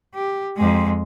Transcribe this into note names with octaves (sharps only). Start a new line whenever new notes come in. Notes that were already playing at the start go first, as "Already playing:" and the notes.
G4
F2 G#3